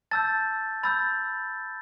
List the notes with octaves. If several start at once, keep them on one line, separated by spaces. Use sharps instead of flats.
A5 E6 G6 A6
B5 E6 G6 A6